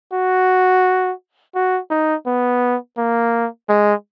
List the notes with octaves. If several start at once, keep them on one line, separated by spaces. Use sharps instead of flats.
F#4
F#4
D#4
B3
A#3
G#3